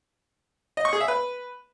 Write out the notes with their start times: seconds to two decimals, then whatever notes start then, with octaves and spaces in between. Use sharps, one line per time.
0.77 D#5
0.85 C#6
0.93 G#4
1.00 E5
1.08 B4